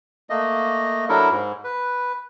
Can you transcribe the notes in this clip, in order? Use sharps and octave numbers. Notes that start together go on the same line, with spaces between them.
A3 A#3 D#5
F#3 D4 E4 A4 A#4
G#2
B4